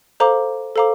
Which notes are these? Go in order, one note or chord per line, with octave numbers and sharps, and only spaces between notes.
A4 C5 F5 A#5 D6
A4 C5 F5 A#5 D6